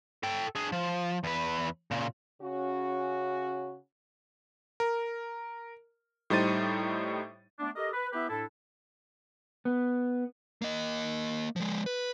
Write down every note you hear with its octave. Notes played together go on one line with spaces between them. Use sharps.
A4 G5
D4 G#4
F3
E2 B4
A#2 C#3
C#3 C#4 F#4
A#4
A2 G3 D#4 C5 A6 D#7
A3 B3 D4
G4 A4 A#4 D#5
B4
B3 E4 G4 B4 E5
A2 D4 E4 A4
B3
A#3 D#5
F3 G#3
B4